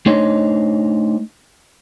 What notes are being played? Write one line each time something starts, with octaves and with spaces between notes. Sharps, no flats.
A3 D4 D#4 C5 C#5 D#5